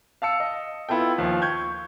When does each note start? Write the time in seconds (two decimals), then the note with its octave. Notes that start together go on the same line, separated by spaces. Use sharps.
0.22 F5 A5 E6 C#7
0.40 D#5
0.89 B3 E4 F4 A4 G5
1.18 D#2 F3
1.42 C#6 G6 G#6